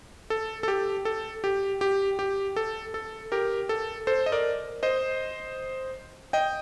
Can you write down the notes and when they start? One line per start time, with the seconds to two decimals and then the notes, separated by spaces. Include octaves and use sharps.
0.30 A4
0.63 A4
0.68 G4
1.05 A4
1.44 G4
1.81 G4
2.19 G4
2.56 A4
2.94 A4
3.32 G4 A#4
3.69 A4
4.07 A4 C5
4.26 D#5
4.32 A#4 D5
4.83 C5 D#5
6.33 D#5 G5